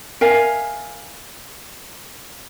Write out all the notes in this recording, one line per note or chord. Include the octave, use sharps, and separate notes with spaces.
A#4 E5 F5 G#5